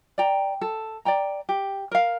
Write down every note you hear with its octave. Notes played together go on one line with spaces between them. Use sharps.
D5 G5 A#5
A4
D5 G5 A#5
G4
A#4 F5